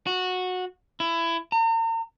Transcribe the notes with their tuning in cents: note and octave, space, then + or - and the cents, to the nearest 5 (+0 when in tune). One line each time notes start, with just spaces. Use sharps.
F#4 -15
E4 +20
A#5 -40